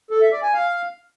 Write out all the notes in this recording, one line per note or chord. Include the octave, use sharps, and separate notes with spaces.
A4
E5
D5
G#5
F5